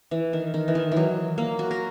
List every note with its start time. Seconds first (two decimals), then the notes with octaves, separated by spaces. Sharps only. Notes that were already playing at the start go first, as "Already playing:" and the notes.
0.11 E3
0.33 D#3
0.54 D#3
0.68 E3
0.75 D#3
0.91 E3
0.96 F#3
1.38 A#3
1.59 F#4
1.71 A#4